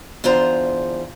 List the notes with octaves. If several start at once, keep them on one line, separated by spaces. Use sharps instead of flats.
E2 D4 F4 C5 A#5